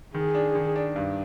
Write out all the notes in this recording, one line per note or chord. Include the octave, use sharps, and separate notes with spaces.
D#3 G#4
D4
D#3
D4
G2